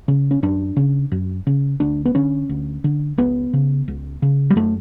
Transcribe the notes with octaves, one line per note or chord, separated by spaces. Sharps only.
C#3
C#4
F#2 D4
C#3
F#2
C#3
D2 D4
B3
D3 C#4
D2
D3
C#2 B3
C#3
C#2
C#3
G3
F#2 A3